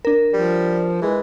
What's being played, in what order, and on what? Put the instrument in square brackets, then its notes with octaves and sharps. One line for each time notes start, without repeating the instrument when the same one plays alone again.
[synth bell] D4 A#4
[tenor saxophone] F3 [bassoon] G3
[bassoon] E3 [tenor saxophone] G#3